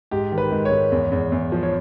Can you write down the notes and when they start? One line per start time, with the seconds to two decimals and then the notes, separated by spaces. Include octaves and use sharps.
0.11 G#2 G4
0.32 D#3
0.38 B4
0.52 G#2
0.65 C#5
0.72 G#2
0.92 E2
1.12 E2
1.32 E2
1.52 F3
1.63 C#5